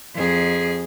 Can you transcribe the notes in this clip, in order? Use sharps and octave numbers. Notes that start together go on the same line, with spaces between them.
F2 G#4